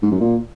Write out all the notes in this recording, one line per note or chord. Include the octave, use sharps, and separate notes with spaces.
G#2
F#2
A#2